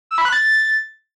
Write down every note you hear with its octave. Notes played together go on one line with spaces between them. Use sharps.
E6
B5
F#6
A6